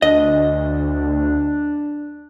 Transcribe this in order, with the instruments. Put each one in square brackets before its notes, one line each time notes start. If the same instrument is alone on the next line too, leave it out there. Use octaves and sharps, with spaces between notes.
[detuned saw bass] D2 [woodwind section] D4 [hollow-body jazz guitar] D#5